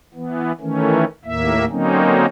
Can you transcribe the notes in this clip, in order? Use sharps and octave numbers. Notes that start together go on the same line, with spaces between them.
E3 B3
D#3 E3 A3 C#4
D#2 A2 A#3 E5
D3 F#3 A#3 C4 C#4 D#4